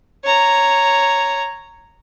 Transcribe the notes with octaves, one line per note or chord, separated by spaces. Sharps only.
C#5 A#5